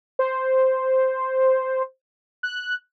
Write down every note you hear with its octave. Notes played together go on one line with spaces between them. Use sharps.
C5
F#6